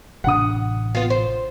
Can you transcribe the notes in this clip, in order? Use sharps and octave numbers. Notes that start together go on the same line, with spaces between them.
A1 C3 D4 F#5 D#6
B3 F4
C5